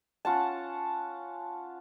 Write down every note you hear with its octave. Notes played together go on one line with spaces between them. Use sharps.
C#4 F4 F#5 A5